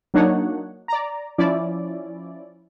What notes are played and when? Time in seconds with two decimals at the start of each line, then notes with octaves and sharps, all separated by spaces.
0.14 F#3 A#3 D4 D#4 C#5 F#5
0.88 D5 A#5
1.38 F3 C#4 E4 D5